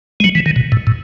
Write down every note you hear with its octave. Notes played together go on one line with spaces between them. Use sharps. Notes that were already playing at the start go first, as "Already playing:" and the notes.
G#3
F#3
E3
D#3
B2
A2
A2